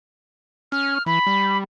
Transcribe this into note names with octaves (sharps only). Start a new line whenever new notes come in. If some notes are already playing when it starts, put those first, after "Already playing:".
C#4 F6
E3 B5
G3